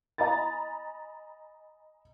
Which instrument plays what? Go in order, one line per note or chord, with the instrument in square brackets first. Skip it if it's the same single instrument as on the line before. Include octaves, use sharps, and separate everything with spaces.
[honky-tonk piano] D#5 G#5 A#5 B5 A6